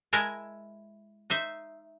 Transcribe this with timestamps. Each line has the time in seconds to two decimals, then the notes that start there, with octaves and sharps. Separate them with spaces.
0.13 G#3 E4 A#4 E5 G#5 A5
1.30 D#4 C5 E5